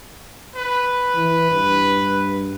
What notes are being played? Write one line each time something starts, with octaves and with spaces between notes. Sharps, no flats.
B4
E3
G2